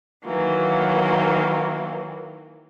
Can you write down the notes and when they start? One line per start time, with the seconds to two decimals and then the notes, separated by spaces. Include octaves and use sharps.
0.25 D#3 E3 F#3 A#3